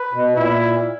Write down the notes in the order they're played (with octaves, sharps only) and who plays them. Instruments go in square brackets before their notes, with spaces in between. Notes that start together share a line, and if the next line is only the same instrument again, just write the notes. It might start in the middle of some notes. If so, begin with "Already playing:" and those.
Already playing: [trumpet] B4
[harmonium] B2
[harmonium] A#2 [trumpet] E4